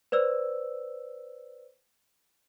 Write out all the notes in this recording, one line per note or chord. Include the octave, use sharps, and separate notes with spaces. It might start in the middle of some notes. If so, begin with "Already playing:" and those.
B4 C5 D5 E6